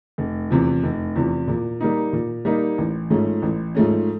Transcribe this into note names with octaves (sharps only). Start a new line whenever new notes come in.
F1
E2 C3 F3
F1
E2 C3 F3
A#2
G3 A#3 D#4
A#2
G3 A#3 D#4
A1
G#2 F3 A3 C#4
A1
G#2 F3 A3 C#4